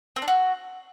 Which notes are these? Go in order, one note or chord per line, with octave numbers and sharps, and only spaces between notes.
C4
D4
F#4